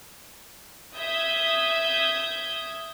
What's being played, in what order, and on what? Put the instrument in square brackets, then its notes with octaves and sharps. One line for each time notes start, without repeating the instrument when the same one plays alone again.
[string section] E5 D#6 G6 G#6